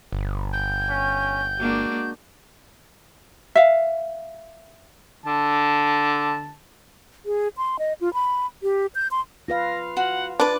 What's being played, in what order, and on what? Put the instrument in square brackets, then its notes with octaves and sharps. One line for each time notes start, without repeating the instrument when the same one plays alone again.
[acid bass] G1
[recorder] G6
[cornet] C#4
[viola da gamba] G#3 A#3 D4 [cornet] F#4
[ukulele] E5 F5
[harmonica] D3 A5
[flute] G#4
C6
D#5
F4
B5
G4
G6
C6
[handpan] F4 B4 F5 [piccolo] A#6
[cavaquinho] F#4 [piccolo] F#5
[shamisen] D4 [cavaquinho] B4 D6 [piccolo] A6